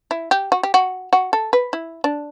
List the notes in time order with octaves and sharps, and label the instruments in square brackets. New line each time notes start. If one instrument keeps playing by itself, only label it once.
[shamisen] E4
G4
F#4
G4
F#4
F#4
A4
B4
E4
D4